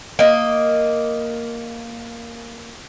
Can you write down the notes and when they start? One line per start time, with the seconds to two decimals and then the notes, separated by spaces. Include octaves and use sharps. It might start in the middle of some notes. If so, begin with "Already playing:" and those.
0.19 A#3 D#5